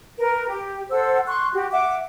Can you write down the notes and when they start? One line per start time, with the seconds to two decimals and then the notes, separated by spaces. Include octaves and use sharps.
0.18 A#4 B4
0.49 G4
0.90 A4 C5 F#5 E6
1.27 C6 C#6 F#6
1.52 F#4 G4
1.71 E5 F#5 D6